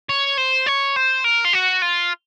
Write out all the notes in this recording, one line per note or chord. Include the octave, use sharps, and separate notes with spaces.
C#5
C5
C#5
C5
A#4
F4
F#4
F4